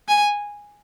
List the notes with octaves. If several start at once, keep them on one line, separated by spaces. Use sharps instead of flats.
G#5